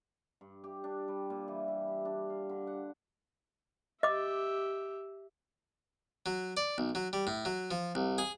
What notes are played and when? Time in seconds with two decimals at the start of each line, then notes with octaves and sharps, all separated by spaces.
0.41 G2
0.64 G4
0.84 D4
1.08 G3
1.30 A#2
1.48 E3
1.68 E4
1.88 G4
2.05 D4
2.30 F5
2.49 D3
2.67 F#5
4.03 G4 D#5 E5 D6
6.26 F#3
6.57 D5
6.78 B1
6.95 F#3
7.13 G3
7.27 A2
7.45 F#3
7.71 F3
7.95 C2
8.18 G#4